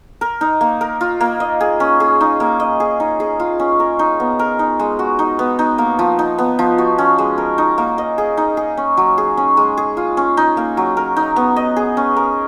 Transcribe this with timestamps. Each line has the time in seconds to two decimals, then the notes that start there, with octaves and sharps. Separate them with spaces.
0.21 A#4
0.41 D#4
0.61 A#3
0.81 A#4
1.01 F4
1.21 A#3
1.40 D#5
1.61 G#4
1.80 C#4
2.00 G#4
2.21 D#4
2.40 A#3
2.60 D#5
2.80 G#4
3.00 D#4
3.20 G#4
3.40 F4
3.60 C#4
3.80 A#4
3.99 D#4
4.20 B3
4.39 A#4
4.59 D#4
4.80 G#3
4.99 F#4
5.19 D#4
5.39 B3
5.59 D#4
5.78 A#3
5.99 F3
6.19 D#4
6.38 B3
6.59 F3
6.78 F#4
6.98 C#4
7.18 G#3
7.38 A#4
7.58 D#4
7.78 A#3
7.98 D#5
8.18 G#4
8.37 D#4
8.57 G#4
8.77 C#4
8.97 F#3
9.18 G#4
9.37 C#4
9.57 G#3
9.77 G#4
9.97 F4
10.17 C#4
10.37 D#4
10.57 A#3
10.77 F#3
10.97 A#4
11.17 D#4
11.36 B3
11.56 D#5
11.76 G#4
11.97 C#4
12.17 A#4